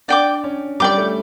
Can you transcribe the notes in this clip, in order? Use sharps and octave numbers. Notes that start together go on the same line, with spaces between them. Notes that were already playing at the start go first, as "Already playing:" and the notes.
D4 D5 G5 D6
C#4
G3 D5 G5 D6
A3